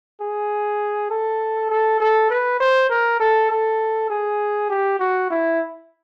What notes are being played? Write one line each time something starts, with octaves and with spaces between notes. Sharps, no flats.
G#4
A4
A4
A4
B4
C5
A#4
A4
A4
G#4
G4
F#4
E4